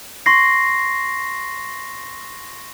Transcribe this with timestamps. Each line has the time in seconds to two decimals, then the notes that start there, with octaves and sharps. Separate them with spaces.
0.26 C6 C#6 A#6 C7